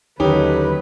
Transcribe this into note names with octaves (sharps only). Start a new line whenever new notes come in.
D#2 D3 F#3 C#4 D#4 G4 B4